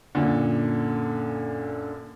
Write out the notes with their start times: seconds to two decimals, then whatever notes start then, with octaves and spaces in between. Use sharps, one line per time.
0.15 F#2 A#2 D3